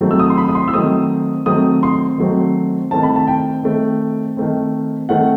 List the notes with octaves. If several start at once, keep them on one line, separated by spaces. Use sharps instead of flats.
D#3 F#3 A3 C4
E6
D#6
C6
B5
D#6
C6
E6
D#3 F#3 A3 C4 D#6
D#3 F#3 A3 C4 D#6
C6
D#3 F#3 A3 C4
D#3 A3 C4 A5
B5
A5
G5
D#3 A3 C4
D#3 A3 C4
D#3 A3 C4 F#5